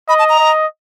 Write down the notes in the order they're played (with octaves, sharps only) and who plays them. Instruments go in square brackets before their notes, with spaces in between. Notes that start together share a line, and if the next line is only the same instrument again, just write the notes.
[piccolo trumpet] D#5 [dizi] B5
[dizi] A5
A#5
[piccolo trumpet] D#5